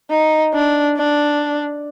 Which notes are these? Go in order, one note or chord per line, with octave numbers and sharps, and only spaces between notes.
D#4
D4
D4